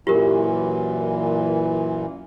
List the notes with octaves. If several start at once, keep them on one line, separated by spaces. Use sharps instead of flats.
F#2 A#2 E3 F4 G4 A#4